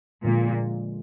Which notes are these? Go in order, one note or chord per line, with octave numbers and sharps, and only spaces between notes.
A#2 D3 F3 G#3